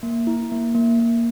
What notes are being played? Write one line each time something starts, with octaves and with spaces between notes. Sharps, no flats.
A#3
E4
A#3
A#3
A#3